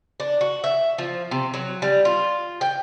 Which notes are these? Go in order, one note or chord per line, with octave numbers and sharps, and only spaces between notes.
D4
F#4
E5
F3
C3
F#3
G3
F4
G5